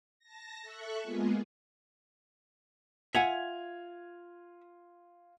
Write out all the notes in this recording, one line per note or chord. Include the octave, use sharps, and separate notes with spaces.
A5 A#6
A4 E5 C#6 F#6
G#3 A#3 B3 F4 G#4
F4 E5 F#5 G#5 G#6 F7